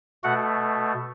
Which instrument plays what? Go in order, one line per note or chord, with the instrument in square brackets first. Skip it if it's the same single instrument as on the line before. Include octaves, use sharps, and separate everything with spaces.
[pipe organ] B2 A3 F#4 F#5